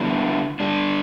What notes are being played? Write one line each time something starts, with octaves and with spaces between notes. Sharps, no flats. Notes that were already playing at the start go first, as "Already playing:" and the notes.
Already playing: D3 G3 B3 E4
D3 G3 D4